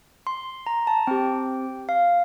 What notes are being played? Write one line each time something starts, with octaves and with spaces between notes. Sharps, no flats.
C6
A#5
A5
C4 G4 G5
F5